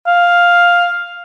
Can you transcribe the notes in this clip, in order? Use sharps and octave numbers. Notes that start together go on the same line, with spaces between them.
F5